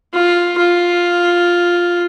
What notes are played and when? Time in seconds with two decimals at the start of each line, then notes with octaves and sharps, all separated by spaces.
0.13 F4
0.58 F4